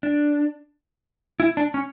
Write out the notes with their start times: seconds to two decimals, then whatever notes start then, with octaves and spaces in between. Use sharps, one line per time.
0.03 D4
1.40 E4
1.57 D4
1.74 C#4